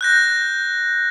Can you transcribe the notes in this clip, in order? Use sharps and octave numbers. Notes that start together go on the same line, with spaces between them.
F#6 G6 A#6